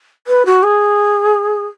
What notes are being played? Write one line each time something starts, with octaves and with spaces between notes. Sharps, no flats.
B4
F#4
G#4